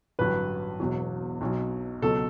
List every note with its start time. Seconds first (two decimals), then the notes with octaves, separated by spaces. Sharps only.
0.19 A1 G2 D3 F#3 B4
0.80 E1 E2 B2 F#3
1.41 B1 B2 F#3
2.02 C#2 B2 F#3 A4